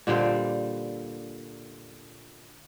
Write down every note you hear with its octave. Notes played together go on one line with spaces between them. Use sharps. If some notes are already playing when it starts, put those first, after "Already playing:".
A#2 D3 G3 C5